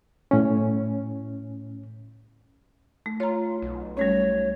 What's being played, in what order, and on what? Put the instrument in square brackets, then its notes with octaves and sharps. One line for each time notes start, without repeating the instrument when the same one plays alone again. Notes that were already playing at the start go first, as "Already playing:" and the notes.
[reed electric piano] A2 C#4
[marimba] A3
[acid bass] F4 [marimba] C#5 A#5
[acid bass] B1
[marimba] G3 A3 C#4 [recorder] C#5